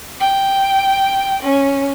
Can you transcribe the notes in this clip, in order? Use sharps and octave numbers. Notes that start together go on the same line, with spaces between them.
G5
C#4